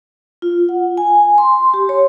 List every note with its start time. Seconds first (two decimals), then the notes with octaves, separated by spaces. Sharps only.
0.42 F4
0.69 F#5
0.97 G#5
1.38 C6
1.74 G4
1.89 C#5